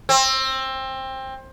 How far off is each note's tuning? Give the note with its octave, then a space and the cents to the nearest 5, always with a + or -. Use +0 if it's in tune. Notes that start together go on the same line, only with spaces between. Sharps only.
C4 +20